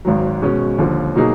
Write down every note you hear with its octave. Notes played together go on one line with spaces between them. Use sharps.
G#1 G#2 D#3 F#3
B2 G#3 C#4
D#2 D3 F3
B2 F#3 A#3 D#4 G#4